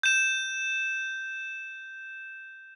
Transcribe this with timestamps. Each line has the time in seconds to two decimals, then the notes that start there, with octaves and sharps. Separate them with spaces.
0.03 G6 E7